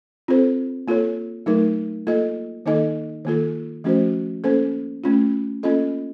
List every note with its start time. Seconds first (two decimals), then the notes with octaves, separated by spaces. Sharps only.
0.28 C4 F4 A4 C5
0.88 A#3 F4 A4 C#5
1.46 F#3 A3 D#4 A#4
2.07 A#3 F4 A4 D#5
2.66 D#3 A#3 D#4 A4 D#5
3.25 D#3 A#3 F4 A4
3.84 F3 A3 C#4 F#4 C5
4.44 A#3 C#4 A4 C5
5.04 A3 C#4 F4
5.63 A#3 C#4 F4 A4 D#5